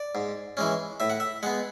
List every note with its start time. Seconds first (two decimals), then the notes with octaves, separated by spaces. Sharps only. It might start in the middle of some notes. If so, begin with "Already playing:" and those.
Already playing: D5
0.15 G#2
0.57 E3 G#3 C#4
1.00 A2 E5
1.10 F#5
1.20 E5
1.43 G#3 B3 F#5